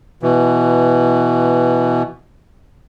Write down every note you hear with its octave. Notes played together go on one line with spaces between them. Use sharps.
B2 E3